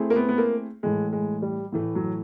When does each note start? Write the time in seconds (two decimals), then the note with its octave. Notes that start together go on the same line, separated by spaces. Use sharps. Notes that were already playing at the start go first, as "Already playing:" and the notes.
Already playing: A3 C4 E4 G#4
0.10 A#3
0.16 B3
0.29 B3
0.38 A#3
0.83 A2 E3 G#3 A3
1.12 G#3
1.42 G3
1.72 A2 E3 A3
1.95 F#3